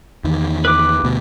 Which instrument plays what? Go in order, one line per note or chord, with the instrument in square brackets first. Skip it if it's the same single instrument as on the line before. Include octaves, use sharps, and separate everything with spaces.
[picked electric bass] E2 D#3
[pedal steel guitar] B4 D6
[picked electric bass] D2 B2